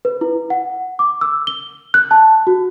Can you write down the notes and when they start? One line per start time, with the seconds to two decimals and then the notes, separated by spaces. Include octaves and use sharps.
0.05 B4
0.21 E4
0.50 F#5
0.99 D6
1.21 E6
1.47 G7
1.94 F#6
2.11 A5
2.47 F#4